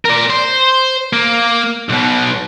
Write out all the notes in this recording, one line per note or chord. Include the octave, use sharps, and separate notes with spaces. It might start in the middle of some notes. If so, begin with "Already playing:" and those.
A#4 D5
C5
A#3
B1 B2